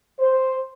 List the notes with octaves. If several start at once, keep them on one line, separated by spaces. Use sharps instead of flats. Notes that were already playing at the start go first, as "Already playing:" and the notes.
C5